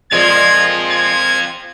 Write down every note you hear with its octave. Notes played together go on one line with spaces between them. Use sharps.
A#2 F3 G#3 C4 F4 G#6
G#6